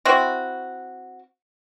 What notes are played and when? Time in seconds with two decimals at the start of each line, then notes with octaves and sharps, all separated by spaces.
0.05 C4 E4 F#4